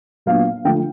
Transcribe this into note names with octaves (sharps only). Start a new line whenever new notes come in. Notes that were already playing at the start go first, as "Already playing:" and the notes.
A#2 F#3 B3 D4 F5
D3 F3 A3 G5